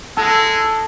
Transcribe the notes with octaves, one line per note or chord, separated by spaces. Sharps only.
G#3 A4